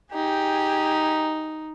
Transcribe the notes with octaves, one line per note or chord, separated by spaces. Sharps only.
D#4 G4 G#4